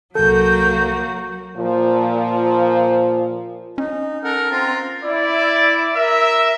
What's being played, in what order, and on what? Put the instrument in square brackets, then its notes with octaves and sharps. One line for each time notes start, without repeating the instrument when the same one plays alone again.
[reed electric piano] C2 A4 [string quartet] F#3 A#3 F#4 [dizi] G6
[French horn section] A#2 F3
[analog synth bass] C#4 [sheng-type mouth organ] D#4
[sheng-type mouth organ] A4 F#5 [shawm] A#4
[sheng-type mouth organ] C4 A#5 [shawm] F4
[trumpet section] E4 D5
A#4 E5